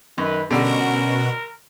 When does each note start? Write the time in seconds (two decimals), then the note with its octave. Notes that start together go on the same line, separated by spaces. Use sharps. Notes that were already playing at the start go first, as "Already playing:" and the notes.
0.18 F#2 D#3 B4
0.50 B2 D3 G3 C#4 F#4 A#4